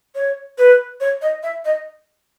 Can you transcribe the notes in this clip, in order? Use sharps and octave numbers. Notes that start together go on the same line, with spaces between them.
C#5
B4
C#5
D#5
E5
D#5